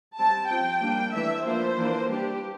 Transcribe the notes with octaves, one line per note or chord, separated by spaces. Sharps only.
G3 C4 A5
F3 C4 G5
G3 A#3 D4
E3 A3 D4 E5
F3 A#3 D4 C5
E3 A#3 D4
G3 D4 G4